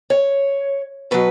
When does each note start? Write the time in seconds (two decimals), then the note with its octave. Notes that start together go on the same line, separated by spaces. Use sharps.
0.10 C#5
1.11 B2 F#3 B4